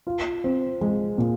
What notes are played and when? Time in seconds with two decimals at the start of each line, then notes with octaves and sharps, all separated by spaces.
0.07 F4
0.44 C4
0.81 G#3
1.18 A#2